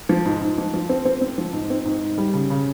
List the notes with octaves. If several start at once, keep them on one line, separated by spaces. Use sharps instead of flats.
F3
G#2
G#2
F3
F3
C4
C4
C4
F3
G#2
C4
G#2
G#2
G3
C#3
C#3